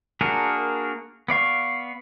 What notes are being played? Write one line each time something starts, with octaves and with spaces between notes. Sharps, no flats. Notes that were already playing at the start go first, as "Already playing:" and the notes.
A#3 D4 F#4 G#4 A#4
B3 D5 F5 C#6